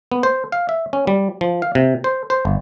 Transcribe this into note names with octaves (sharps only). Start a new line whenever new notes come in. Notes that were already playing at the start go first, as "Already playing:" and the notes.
B3
C5
F5
E5
C#4
G3
F3
F5
C3
C5
C5
G1